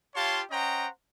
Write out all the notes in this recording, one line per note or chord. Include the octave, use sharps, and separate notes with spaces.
F4 G4 C#5 F5 A5 C6
C#4 C5 D#5 F#5 G5 A#5